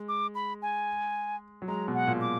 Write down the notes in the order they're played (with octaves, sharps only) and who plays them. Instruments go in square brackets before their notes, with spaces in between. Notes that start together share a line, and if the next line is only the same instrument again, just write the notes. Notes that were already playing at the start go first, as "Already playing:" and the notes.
Already playing: [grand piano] G#3
[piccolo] D6
B5
G#5
[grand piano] F#3
[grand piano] G#3 [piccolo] A#5
[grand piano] B2
[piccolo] F#5
[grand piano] A#2
[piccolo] D6